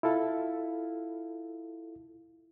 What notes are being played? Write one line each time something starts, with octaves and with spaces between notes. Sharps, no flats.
E4 F4 A4 F5